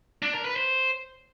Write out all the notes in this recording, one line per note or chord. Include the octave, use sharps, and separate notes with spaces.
D4
A#4
B4
C5